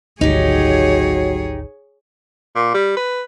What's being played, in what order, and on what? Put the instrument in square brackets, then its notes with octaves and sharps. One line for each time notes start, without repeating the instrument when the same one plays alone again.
[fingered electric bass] G#1 D2 [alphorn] F#3 [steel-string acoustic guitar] D#4 G4 [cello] G#4 C#5
[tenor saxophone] A#2
G3
B4